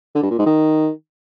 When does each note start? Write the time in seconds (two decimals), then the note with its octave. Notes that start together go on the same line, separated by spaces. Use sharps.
0.15 D3
0.23 G2
0.31 A#2
0.39 G#2
0.47 D#3